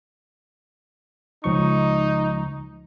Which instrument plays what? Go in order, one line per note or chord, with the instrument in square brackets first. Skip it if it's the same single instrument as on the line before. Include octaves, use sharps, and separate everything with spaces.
[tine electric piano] C#2 F3 C#6 [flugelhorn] D#4